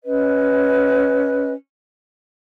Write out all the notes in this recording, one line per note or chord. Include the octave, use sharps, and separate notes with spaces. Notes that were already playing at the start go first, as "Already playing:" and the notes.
C#4 B4 D#5